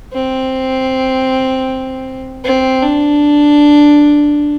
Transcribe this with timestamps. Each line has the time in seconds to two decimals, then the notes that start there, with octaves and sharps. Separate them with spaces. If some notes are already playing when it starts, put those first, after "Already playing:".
0.14 C4
2.44 C4
2.82 D4